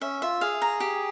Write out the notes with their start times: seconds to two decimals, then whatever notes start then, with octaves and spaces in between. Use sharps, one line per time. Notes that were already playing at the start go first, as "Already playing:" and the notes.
0.01 C#4 E5
0.22 F4 E5
0.41 G#4 F5
0.62 A#5
0.80 G4